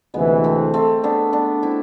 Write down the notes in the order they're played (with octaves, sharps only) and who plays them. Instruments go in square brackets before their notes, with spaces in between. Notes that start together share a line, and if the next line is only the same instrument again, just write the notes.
[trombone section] D2 C3 E3 [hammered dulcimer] G#3 B3
[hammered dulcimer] A3 C4
A3 C4
B3 D4
B3 D4
C4 E4